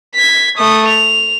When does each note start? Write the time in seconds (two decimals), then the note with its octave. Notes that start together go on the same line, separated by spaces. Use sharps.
0.15 G#6 B6
0.58 A3 D#6
0.88 F7